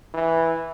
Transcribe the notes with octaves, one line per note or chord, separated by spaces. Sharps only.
E3